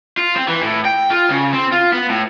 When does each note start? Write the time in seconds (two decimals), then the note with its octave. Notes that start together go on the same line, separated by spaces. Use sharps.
0.17 F4
0.36 C4
0.48 E3
0.62 A2
0.85 G5
1.10 F4
1.29 C#3
1.53 C4
1.72 F4
1.93 B3
2.10 A2